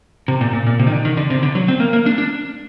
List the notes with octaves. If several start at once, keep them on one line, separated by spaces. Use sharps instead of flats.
C3
A#2
A#2
A#2
C3
D#3
D3
D#3
D3
C3
D3
F#3
C4
A#3
A#3
D4
D4